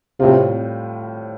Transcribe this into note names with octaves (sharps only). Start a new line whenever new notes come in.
A2 C3 G3 C4 F4